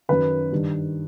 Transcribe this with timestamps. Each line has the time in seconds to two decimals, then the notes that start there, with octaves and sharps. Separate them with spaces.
0.09 F#2 D#3 B4
0.52 G2 D#3